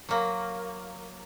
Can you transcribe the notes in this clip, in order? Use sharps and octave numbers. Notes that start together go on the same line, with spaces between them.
F#3 A#3